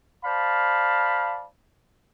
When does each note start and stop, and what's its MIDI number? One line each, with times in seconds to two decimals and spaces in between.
0.24 1.45 72
0.24 1.45 74
0.24 1.45 77
0.24 1.45 81
0.24 1.45 83